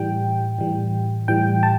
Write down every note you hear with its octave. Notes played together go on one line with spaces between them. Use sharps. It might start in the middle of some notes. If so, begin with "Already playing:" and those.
Already playing: A2 E3 G3 G5
A2 E3 G3
A2 E3 G3 G5
A5